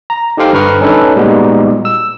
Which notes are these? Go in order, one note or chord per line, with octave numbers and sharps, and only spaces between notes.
A#5
D#4 G4 A4 C5 F5 G5
G2 D3 B4 A#5 C#6 F6
C#4 D#4 A4 B4 C#5
A#2 G3 G#3 B3 D#4 F#4
E6